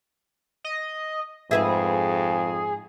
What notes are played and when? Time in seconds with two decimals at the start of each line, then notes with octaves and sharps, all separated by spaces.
0.64 D#5
1.51 F2 G#2 G#4 B4 E5